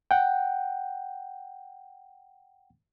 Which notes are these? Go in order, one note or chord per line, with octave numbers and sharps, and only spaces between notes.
F#5 G5